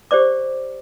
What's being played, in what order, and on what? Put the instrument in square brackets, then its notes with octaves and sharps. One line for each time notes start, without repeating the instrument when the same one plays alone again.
[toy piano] G4 C5 D5 D6